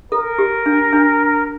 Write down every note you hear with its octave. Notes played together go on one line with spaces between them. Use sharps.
A4 A#4
G4
D4
D4